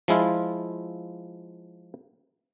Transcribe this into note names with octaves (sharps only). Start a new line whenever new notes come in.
F3 G#3 E4 F4